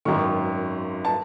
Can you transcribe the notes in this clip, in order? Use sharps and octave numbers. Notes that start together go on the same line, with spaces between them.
G#1 F#2 D#3 C#6
A5